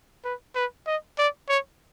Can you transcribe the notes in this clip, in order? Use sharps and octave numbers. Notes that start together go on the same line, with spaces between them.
B4
B4
D#5
D5
C#5